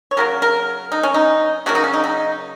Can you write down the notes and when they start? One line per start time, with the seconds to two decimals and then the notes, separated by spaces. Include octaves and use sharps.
0.11 C#5
0.17 C#3 F#3 A#3 A#4
0.42 A#4
0.92 D#4
1.03 C#4
1.14 D#4
1.66 C#3 F#3 A#3 F#4
1.75 D#4
1.84 C#4
1.94 D#4
2.04 D#4